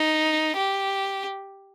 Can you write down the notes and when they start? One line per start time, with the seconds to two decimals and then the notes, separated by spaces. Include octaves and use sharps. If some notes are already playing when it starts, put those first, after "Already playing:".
Already playing: D#4
0.57 G4